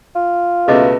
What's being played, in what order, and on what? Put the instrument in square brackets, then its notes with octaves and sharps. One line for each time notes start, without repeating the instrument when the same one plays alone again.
[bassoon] F4
[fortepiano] C#2 B2 A3 [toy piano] G#4 D#5 D6 [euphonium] B4